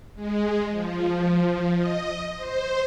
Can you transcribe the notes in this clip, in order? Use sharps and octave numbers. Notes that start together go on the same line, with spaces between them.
G#3
F3
D#5
C5